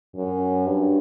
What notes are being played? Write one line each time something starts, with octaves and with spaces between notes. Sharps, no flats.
F#2
G2